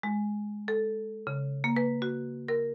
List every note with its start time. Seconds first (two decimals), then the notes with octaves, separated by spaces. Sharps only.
0.03 G#3
0.68 A4
1.27 C#3
1.64 A#3
1.76 B4
2.02 F#4
2.48 A#4